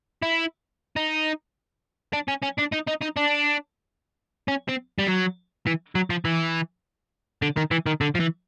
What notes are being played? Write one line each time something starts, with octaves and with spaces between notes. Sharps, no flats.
E4
D#4
D4
C#4
C#4
D4
D#4
D#4
D#4
D4
C#4
C4
G3
F#3
E3
F#3
F3
E3
D3
D#3
E3
D#3
D3
F3
E3